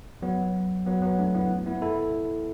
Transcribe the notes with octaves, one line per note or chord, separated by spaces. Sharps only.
F#3 B3
F#3 B3
F#3 B3
A3 D4
B3 E4
B3 E4
E4 A4